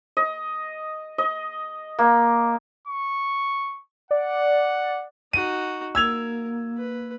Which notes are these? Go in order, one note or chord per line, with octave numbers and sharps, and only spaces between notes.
D#5
D#5
A#3
C#6
D5 F#5
D#4 F#4 D#7
A#3 A#4 E6 G#6 F7
B4